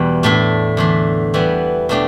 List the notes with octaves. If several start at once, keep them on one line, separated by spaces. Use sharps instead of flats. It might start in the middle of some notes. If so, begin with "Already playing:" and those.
Already playing: E2 B2 E3 G3
A2 A3 D4 A4
E2 D3 A3
E3 G3 B3 E4
B2 A3 D4 G4